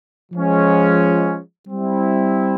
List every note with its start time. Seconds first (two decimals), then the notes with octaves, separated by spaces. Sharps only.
0.32 F3 G#3 C#4
1.67 G3 C4 E4